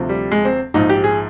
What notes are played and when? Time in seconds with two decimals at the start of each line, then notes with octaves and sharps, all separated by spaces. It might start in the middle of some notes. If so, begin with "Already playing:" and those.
Already playing: D2 C3 F3
0.09 G3
0.31 G#3
0.45 C4
0.74 A#1 G#2 F3 D#4
0.89 G4
1.04 G#4